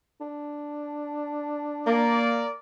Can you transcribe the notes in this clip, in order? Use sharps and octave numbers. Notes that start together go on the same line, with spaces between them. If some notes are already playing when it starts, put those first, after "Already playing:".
D4
A#3 A#4 D5